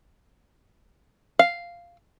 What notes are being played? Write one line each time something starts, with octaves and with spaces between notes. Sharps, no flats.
F5